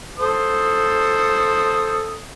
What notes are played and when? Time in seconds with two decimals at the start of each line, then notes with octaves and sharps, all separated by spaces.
0.19 A4 C5 D#6